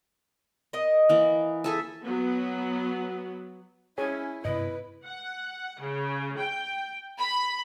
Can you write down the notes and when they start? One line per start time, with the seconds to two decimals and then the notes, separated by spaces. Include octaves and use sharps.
0.73 A#4 D#5
1.09 E3 A#3
1.64 G#4 A4 E5
2.04 F#3 B3
3.98 C#4 E4 G#4 C#5 G#5
4.45 G2 C3 B3 E4 B4 D#5
5.05 F#5
5.80 C#3
6.38 G5
7.19 B5